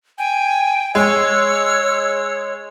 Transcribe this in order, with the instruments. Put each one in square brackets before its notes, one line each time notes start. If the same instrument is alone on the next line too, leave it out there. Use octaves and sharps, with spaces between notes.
[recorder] G5 [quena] G#5
[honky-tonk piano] G#3 [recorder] C#5 [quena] E6